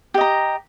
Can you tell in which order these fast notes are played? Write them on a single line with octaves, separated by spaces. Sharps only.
G4 D#5 A#5